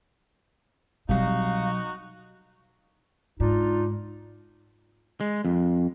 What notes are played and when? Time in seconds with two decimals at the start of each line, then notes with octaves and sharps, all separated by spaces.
1.09 C2 B2 F#3 D#4 F#4 F5
3.40 G#2 D4 D#4 F4
5.21 G#3
5.45 F2